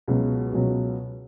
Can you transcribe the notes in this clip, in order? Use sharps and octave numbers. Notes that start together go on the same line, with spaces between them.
C#2 B2 F#3
C#2 B2 F#3